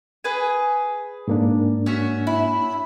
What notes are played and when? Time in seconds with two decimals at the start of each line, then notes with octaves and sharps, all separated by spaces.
0.24 G#4 B4 G#5
1.28 G#2 A#3 D4
1.86 C#4 F#4 E5
2.27 E4